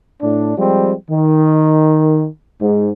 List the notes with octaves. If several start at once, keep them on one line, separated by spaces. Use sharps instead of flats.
A2 D4
F3 G3 G#3 C4
D#3
G#2